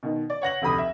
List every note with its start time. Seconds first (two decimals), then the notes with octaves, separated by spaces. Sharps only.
0.03 B2 D#3
0.30 D5
0.42 C#5 F#5 A#6 F#7
0.62 F1 D2 G4 B5 D#6
0.78 E5